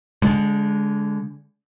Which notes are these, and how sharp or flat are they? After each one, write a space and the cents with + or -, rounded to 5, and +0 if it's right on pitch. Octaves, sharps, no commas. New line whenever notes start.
D3 -25 G#3 +0